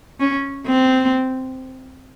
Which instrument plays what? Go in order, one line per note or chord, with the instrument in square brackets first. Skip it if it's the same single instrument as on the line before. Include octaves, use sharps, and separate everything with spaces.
[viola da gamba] C#4
C4